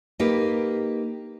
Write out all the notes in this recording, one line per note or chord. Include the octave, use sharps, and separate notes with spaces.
A#3 D#4 G4 B4